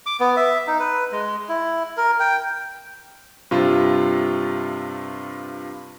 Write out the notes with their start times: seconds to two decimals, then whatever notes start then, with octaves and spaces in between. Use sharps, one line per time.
0.06 D6
0.20 B3
0.36 E5
0.67 D#4
0.80 B4
1.12 G#3
1.49 E4
1.97 A#4
2.20 G5
3.51 G2 C3 F4